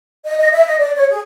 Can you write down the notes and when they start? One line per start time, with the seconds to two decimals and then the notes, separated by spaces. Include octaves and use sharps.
0.25 D#5
0.38 D#5
0.52 E5
0.66 D#5
0.78 D5
0.95 C#5
1.10 G#4